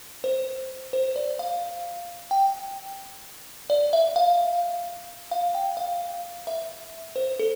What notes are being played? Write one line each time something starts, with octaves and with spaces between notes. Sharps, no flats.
C5
C5
D5
F5
G5
D5
E5
F5
F5
G5
F5
E5
C5
A4